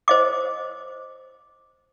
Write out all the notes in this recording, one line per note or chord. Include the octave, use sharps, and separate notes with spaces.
C5 D#5 D6